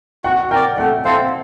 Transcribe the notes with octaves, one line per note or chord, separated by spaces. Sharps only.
F#4 F#5
A#4 D5 G5
A3 F#5
C4 E4 A4 C5 F5